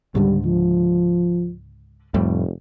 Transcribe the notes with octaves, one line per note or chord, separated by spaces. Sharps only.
C#2 G#2 D3 G3
F3
F1 F2 A2 G3